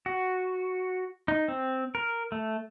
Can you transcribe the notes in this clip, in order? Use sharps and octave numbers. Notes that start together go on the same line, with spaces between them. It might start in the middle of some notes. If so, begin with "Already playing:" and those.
F#4
D#4
C4
A#4
A3